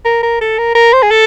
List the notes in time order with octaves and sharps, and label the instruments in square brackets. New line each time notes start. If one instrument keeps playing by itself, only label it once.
[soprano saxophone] A#4
A#4
A4
A#4
A#4
C5
G#4
A4